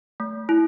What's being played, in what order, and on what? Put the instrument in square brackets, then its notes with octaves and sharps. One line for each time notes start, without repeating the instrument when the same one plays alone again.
[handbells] A3
E4